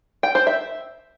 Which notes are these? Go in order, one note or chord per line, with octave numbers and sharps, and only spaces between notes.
G5
C5
E5